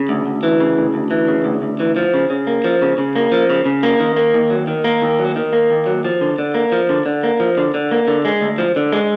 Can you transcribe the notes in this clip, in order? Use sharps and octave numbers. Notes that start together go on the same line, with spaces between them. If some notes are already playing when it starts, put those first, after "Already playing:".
Already playing: C#3
D2
D2
E3
C#3
D2
D2
E3
C#3
D2
D2
E3
F3
C#3
C#3
A#3
F3
C#3
C#3
A#3
F3
C#3
C#3
A#3
D#3
A#3
D#2
F#3
D#3
A#3
D#2
F#3
D#3
A#3
D#2
F#3
F3
D3
D3
A#3
F3
D3
D3
A#3
F3
D3
D3
A#3
D3
G#3
D2
F3
D3
G#3